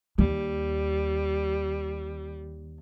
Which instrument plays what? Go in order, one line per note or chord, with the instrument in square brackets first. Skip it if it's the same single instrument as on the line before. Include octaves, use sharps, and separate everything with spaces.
[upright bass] D#2 [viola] G3